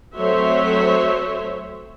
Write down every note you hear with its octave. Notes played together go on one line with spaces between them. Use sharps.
F#3 A3 C4 C5 C#5 E5